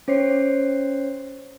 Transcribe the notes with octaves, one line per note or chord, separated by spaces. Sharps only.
C#4 C5 C#5 C7